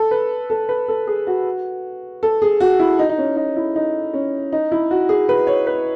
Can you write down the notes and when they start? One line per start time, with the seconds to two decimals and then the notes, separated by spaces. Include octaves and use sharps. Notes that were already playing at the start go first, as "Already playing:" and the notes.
Already playing: A4
0.11 B4
0.50 A4
0.69 B4
0.88 A4
1.07 G#4
1.27 F#4
2.23 A4
2.42 G#4
2.60 F#4
2.80 E4
2.99 D#4
3.09 D#4
3.18 C#4
3.37 D#4
3.56 E4
3.76 D#4
4.14 C#4
4.52 D#4
4.72 E4
4.91 F#4
5.09 G#4
5.29 B4
5.47 C#5
5.67 B4